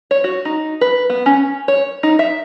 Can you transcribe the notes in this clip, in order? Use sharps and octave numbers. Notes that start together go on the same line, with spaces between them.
C#5
F#4
D#4
B4
B3
C#4
C#5
D#4
E5